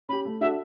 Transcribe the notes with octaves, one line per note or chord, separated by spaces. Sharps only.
C#4 G4 B5
A3
D4 F#4 A4 E5